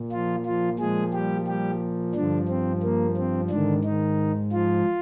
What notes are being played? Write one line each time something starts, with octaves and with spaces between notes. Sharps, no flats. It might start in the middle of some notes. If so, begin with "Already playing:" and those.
Already playing: A#2
F3 F4
F3 F4
A#2 F3 G#3 G#4
G3 G4
G3 G4
G2 D3 F3 D4
C4
A#3
C4
G#2 D3 D#3 D4
D#3 D#4
F3 F4